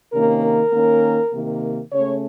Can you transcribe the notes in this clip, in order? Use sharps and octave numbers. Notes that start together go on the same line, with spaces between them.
C3 D#3 A#3 C#4 A#4
A#4
D#3 A#3 C#4
C3 D#3 A#3
C#3 A3 C#4 C#5